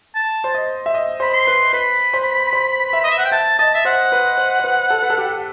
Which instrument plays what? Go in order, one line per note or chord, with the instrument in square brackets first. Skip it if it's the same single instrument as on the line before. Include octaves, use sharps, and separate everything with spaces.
[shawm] A5
[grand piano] C5
D#5
E5
D#5
[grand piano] C5 [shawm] B5
[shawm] C6
[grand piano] B4
[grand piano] B4 [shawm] B5
[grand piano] C5
C5
E5
[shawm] D#5
E5
F#5
G5
[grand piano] E5 [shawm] A5
[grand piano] D#5 [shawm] A5
[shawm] E5
[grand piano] C5 [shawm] F#5
[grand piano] B4
C5
C5
B4
A4
B4
A4
G4